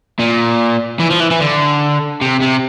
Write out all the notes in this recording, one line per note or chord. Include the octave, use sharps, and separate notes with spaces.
A#2
E3
F3
E3
E3
D3
C3
C3